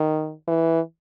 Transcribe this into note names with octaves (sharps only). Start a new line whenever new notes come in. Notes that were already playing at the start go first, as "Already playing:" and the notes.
Already playing: D#3
E3